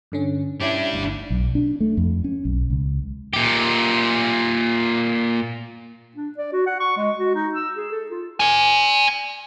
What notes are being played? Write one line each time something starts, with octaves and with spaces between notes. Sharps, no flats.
G2 D3 C#4
C#4 D4 E4 G4 G#6
G1 D2
B1
D4
A3
F2
C#4
B1
C#2
A#2 G4
D4
D5
F#4
F#5
C#6
G#3
F#4
D#4
E6
G#4
A4
F4
D5 G#5